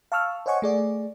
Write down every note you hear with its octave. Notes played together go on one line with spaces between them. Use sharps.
F5 A5 C#6 E6 F6
C5 C#5 D#5 F#5 G#5 C#6
A3 G#4 D5